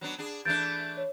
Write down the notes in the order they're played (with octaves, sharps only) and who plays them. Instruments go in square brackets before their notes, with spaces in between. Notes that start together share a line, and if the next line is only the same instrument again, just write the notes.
[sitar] F#3 B3 D4
D4 G#4
[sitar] E3 A3 D4 [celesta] G6 A6 D7
[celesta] C#5